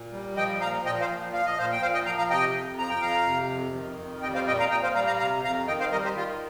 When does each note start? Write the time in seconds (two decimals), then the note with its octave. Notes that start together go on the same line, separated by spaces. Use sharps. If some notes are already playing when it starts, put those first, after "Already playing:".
Already playing: A#2
0.12 G3
0.36 F3 D#5 G5
0.61 A#2 F5 A#5
0.86 A#2 D#5 G5
1.01 C5 F5
1.09 F3
1.33 F3 F5
1.46 D#5
1.57 A#2 C5 F5
1.72 G5
1.81 A#2 C5 F5
1.94 D#5 G5
2.05 F3 F5 A#5
2.18 F5 A#5
2.30 C3 D#5 G5
2.54 F2
2.78 F3 A#5
2.90 G5
3.01 F2 F5 A#5
3.26 C3
3.50 F2
3.75 D#3
3.99 F2
4.23 G3 D#5 G5
4.35 C5 F5
4.47 A#2 D#5 G5
4.60 F5 A#5
4.71 A#2 D#5 G5
4.83 C5 F5
4.95 G3 F5 A#5
5.07 F5 A#5
5.19 C3 F5 A#5
5.44 F2 F5 A#5
5.68 D#3 D#5 G5
5.80 C5 F5
5.92 G3 A#4 D#5
6.04 G4 C5
6.16 D#3 F4